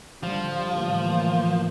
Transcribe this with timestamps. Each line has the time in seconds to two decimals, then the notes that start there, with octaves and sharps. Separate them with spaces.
0.23 D3 F3 G3
0.74 A2 E3 A#3